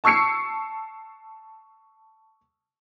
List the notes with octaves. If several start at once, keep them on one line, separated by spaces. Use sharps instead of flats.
A5 C#6 E6 C7 C#7